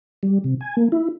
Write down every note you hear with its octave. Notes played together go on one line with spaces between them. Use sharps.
G3
C3
G#5
A#3
E4